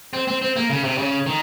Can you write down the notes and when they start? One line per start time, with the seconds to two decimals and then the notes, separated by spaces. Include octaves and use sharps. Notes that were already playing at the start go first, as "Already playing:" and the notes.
0.13 C4
0.27 C4
0.42 C4
0.56 A#3
0.70 C#3
0.84 C3
0.98 C#3
1.26 D#3